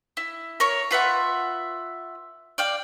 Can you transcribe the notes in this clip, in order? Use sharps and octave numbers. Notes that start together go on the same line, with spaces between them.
E4
A#4 C#5
F4 B4 E5 F#5
D5 F5 G5